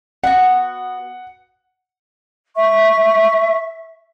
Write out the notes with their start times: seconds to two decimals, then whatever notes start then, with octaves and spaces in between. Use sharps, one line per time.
0.24 B3 F#4 F#5
2.55 E5 C#6